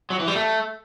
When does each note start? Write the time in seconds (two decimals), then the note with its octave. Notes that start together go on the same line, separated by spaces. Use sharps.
0.10 F#3
0.20 E3
0.27 G3
0.36 A3